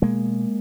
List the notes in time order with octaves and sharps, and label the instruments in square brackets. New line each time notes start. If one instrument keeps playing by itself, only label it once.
[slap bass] B2 G#3 A#3